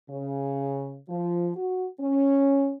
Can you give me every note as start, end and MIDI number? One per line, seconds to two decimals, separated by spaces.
0.10 0.99 49
1.09 1.51 53
1.56 1.87 66
2.00 2.73 61